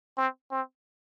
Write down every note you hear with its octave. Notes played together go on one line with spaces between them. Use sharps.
C4
C4